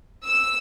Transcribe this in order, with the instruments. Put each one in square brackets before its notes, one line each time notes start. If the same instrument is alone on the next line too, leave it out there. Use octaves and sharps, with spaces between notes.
[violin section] E6